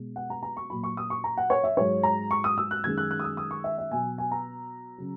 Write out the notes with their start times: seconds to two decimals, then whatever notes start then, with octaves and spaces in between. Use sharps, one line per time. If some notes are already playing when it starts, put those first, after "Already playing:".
Already playing: B2 G#3
0.16 F#5
0.30 A#5
0.43 A#5
0.57 C#6
0.70 A#2 F#3 B5
0.84 C#6
0.97 D#6
1.10 C#6
1.24 A#5
1.37 F#5
1.50 C#5
1.64 E5
1.77 G#2 F#3 C#5
2.03 A#5
2.31 C#6
2.44 D#6
2.58 E6
2.71 F#6
2.84 F#2 D#3 G#3 G#6
2.98 F#6
3.11 F#6
3.19 D#6
3.24 E6
3.37 D#6
3.51 C#6
3.64 E5
3.78 E5
3.91 B2 F#3 G#5
4.18 G#5
4.32 A#5
4.98 C#3 F#3